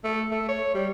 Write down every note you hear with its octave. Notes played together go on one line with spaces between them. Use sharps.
A3
A3
C#5
G3